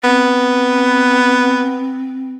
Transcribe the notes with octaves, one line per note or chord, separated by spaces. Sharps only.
B3 C4